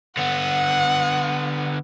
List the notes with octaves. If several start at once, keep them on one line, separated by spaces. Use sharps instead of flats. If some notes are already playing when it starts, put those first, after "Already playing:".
D3 B3 F#5